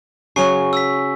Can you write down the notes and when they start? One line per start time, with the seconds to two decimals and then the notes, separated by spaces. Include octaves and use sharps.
0.36 C#3 F#3 C#4 G#5 C#6 C7
0.73 E6 B6